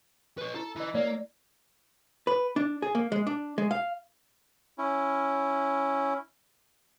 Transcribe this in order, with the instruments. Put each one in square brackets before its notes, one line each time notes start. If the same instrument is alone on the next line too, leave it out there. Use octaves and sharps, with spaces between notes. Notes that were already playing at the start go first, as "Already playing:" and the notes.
[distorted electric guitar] B4 C#5
[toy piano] E4 [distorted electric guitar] A4
[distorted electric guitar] E3 [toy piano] D#5 E6
[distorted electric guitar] A#3 [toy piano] C#5 D5
[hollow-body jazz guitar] B4
D4
G#4
A#3
G#3
D4
G#3
F5
[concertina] C#4 E4